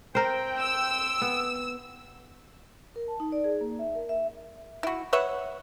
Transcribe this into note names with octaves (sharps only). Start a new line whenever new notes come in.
C4 A#4 C5 G5
E6
B3
A#4
A5
D#4
D5
G#4
A#3
E5
A#4
E5
E4 F#4
B4 C#5 E5 F#5